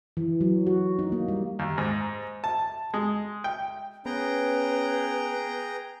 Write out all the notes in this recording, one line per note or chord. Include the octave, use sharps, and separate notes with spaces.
E3
F#3
F#4
D#4
A#3
G3
D#2
G#2
A5
G#3
G5
B3 C#4 G#4 B4 G5 A#5